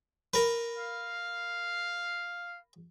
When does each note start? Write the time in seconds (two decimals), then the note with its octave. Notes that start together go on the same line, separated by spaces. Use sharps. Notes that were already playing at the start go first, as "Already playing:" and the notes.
0.34 A#4 B4
0.78 F5